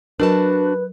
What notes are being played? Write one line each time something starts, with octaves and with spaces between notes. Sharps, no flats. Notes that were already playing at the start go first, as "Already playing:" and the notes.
F#3 D4 F#4 A#4 B4 A5